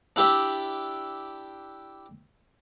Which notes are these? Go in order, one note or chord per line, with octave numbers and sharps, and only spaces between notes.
D4 E4 G4 D5 E5